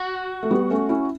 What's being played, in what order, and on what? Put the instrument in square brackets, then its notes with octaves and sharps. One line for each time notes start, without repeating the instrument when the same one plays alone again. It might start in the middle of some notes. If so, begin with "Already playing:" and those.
Already playing: [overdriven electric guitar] F#4
[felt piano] A3
G3 B3
A3 C#4
C#4 E4